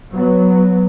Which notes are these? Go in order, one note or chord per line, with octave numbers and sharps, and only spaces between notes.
F#3 B3